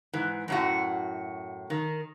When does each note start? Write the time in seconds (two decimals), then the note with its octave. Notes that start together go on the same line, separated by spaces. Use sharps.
0.13 G#2 E3
0.48 F#2 A2 F#4
1.70 D#3